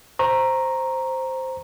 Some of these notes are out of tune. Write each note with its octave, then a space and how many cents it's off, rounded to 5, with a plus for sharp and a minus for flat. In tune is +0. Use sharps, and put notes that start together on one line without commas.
C5 +0 A#5 +0 C#6 -35